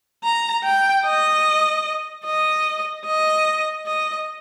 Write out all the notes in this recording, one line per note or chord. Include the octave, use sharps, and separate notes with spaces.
A#5
G5
D#5
D#5
D#5
D#5